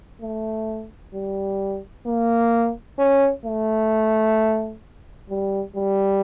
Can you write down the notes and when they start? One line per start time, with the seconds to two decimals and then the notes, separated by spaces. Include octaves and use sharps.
0.22 A3
1.14 G3
2.06 A#3
2.98 C#4
3.45 A3
5.30 G3
5.76 G3